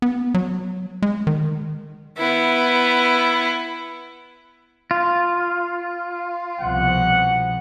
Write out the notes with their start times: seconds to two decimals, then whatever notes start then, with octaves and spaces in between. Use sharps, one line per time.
0.02 B3
0.34 F#3
1.02 G#3
1.27 D#3
2.18 B3 E4
4.91 F4
6.61 C2 B2 F3 F#5